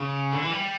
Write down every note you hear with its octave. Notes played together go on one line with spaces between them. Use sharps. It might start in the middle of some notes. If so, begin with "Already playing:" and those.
Already playing: C#3
D3
E3
G3